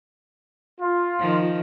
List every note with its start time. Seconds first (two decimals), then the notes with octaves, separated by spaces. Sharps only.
0.80 F4
1.19 D#3 F3